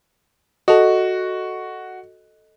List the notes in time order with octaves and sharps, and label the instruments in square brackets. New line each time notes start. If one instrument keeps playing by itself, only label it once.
[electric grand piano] F#4 [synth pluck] A4 D#5